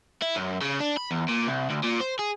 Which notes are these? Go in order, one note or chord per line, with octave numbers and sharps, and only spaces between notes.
E4
F#2
C#3
D4
B5
E2
A#2
C2
D2
A#2
C5
G#4